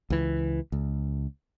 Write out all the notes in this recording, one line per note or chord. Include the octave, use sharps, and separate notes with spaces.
C#2 E3
C#2